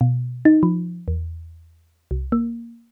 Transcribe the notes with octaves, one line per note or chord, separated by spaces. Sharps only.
B2
D#4
F3
E2
C2
A#3